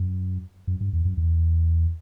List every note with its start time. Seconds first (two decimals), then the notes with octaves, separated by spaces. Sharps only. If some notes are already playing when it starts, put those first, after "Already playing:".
Already playing: F#2
0.67 F#2
0.81 G2
0.93 E2
1.05 F#2
1.17 E2